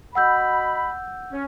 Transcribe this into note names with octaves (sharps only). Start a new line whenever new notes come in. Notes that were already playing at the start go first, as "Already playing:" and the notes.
F#4 D#5 F#5 B5 E6 G6
C#4